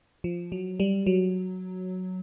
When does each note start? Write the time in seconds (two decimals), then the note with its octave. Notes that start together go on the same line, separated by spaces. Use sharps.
0.24 F3
0.52 F#3
0.80 G3
1.06 F#3